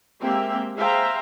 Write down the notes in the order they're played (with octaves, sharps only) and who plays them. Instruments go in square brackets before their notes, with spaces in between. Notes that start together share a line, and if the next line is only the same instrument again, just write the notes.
[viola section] G#3 A#3 C4 G4 E5 G5
G#4 C5 E5 F5 G5 A#5